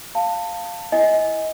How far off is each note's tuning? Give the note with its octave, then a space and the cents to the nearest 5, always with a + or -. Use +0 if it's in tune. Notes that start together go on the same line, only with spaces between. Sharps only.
F5 +0 A5 +25
E4 +0 D#5 +25 G#5 +0